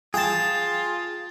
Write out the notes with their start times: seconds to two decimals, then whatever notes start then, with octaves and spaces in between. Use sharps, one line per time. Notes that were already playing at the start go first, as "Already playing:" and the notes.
0.14 F4 G#4 G5 A5